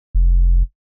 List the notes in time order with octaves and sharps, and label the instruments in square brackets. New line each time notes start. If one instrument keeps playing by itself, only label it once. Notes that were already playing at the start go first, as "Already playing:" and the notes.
[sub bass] F1